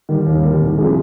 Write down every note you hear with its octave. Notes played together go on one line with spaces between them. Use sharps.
D#3 G3
D#2
D#3 G3
C2
C3 F3 G#3